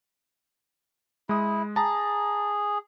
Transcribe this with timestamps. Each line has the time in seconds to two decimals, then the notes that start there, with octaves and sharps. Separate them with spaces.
1.29 G#3 E4 D#6
1.76 G#4 A5 A#5